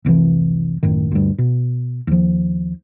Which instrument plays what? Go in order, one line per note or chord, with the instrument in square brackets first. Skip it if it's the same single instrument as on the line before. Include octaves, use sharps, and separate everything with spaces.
[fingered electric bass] F1 C2 A#2 E3
A1 F#2 A2 D#3
D2 G2
B2
D#2 F3